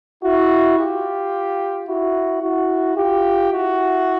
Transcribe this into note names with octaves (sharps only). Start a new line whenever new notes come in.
E4 F#4
F4 G4
E4 F#4
E4 F#4
F4 G4
E4 F#4